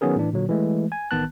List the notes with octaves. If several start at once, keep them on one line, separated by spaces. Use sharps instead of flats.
D#3 F#3 B3 C#4 G#4 A#4
A2 E3 D4
A#2 D3 F#3
E3 G#3 A3
G#5
A1 D#3 B3 A5 F#6